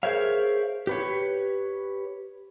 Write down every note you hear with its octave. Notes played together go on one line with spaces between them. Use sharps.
G#4 A#4 C5 C#5 E5 F5
G4 B4 C#5